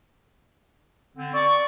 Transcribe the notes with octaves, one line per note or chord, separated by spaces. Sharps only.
D3 C4
D5 C#6